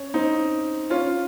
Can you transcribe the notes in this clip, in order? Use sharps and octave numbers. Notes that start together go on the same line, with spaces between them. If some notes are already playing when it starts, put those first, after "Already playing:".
Already playing: C#4
C4 D#4
C#4 F4